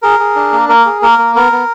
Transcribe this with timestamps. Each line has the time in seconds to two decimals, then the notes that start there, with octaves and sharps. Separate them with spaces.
0.02 G#4 A#4
0.19 G#4
0.36 D4
0.53 A#3
0.69 A#3 A#4
0.86 G#4
1.02 A#3 A#4
1.19 A#3
1.36 B3 A#4
1.52 B3